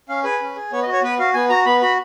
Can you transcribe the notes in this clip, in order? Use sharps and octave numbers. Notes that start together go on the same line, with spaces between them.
C#4 F5
G#4 B4
C#4
G#4
B3 C#5
D#5
F#4
C#5
B3 B4
F#4 F5
B3 G#5
F#4 A#5
B3 B5
F#4 B5